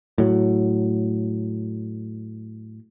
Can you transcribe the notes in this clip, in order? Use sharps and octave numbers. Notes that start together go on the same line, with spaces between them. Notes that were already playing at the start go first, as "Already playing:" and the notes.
A2 F#3